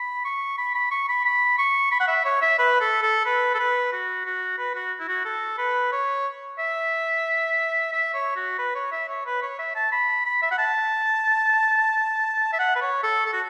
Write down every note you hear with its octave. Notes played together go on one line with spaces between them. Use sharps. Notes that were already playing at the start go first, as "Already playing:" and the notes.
Already playing: B5
C#6
B5
B5
C#6
B5
B5
C#6
B5
F#5
E5
C#5
E5
B4
A4
A4
B4
A4
B4
F#4
F#4
B4
F#4
E4
F#4
A4
B4
C#5
E5
E5
C#5
F#4
B4
C#5
E5
C#5
B4
C#5
E5
A5
B5
B5
E5
F#5
A5
E5
F#5
B4
C#5
A4
A4
F#4